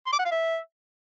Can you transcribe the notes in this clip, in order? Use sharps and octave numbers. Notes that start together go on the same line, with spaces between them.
C6
D6
F#5
F5
E5